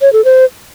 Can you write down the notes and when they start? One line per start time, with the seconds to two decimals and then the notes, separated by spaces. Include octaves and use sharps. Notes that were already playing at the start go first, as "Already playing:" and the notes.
0.01 C#5
0.13 A4
0.25 C5